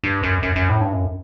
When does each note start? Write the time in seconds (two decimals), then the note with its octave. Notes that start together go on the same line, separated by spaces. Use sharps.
0.04 G2
0.23 F#2
0.43 F#2
0.56 F#2
0.69 A2
0.81 G2
0.93 F#2